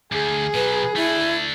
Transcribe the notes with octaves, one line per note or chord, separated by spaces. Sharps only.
D2 G#4
B2 F#3 B4
A3 D4 E4